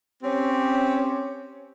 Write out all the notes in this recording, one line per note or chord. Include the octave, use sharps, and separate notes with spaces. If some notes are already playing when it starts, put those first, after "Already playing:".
C4 C#4 G4